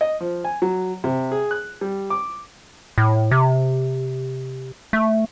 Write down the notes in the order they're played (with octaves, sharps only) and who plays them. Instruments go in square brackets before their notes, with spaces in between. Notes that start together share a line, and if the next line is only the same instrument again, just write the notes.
[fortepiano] D#5
F3
G#5
F#3
C3
G#4
F#6
G3
D6
[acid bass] A2
C3
A3